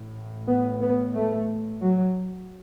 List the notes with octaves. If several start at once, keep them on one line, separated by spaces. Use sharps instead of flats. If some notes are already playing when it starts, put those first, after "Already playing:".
Already playing: A1 A2
B3
B3
A3
F#3